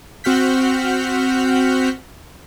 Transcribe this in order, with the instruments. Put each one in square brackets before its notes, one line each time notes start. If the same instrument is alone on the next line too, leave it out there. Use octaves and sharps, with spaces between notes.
[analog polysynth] C4 F#4 F#5 F6 G6 B6